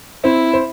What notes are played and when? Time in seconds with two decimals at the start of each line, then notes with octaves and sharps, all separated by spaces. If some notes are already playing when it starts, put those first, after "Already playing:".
0.24 C4 E4 C5
0.53 C5